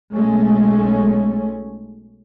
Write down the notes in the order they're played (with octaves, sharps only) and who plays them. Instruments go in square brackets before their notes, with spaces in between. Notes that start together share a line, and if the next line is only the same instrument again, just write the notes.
[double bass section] B1 G#3 A3 C#4